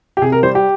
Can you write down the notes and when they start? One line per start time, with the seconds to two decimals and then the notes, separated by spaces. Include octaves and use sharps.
0.17 G4
0.22 C3 G#4
0.32 A#4
0.43 G3 C5
0.55 G4